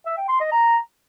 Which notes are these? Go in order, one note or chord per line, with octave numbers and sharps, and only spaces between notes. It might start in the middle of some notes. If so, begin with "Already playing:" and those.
E5
G5
C6
D#5
A#5